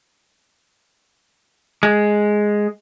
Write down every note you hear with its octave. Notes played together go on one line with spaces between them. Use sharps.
G#3